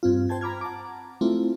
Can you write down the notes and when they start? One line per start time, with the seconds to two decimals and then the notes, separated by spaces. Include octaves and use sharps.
0.03 G2 C4 F4
0.29 C5 G5 A5 G#6
0.41 A#5 B5 D6 F6 G#6
0.61 F#5 A5 A#5 D6
1.21 A3 C4 E4 F4